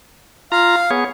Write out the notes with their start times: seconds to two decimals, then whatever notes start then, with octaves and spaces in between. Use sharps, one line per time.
0.52 F4 F5 A#5
0.91 B3 G#4 C#5